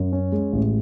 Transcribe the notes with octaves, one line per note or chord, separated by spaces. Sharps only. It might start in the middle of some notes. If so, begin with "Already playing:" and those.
Already playing: F#2
C#4
G#3
A1